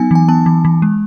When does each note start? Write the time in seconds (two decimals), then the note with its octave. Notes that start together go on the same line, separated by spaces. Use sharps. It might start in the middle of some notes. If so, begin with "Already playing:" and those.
Already playing: F#3 B3 D#4 G#5
0.11 E3 G#5
0.29 B3 A5
0.46 E3
0.65 E3
0.82 G#3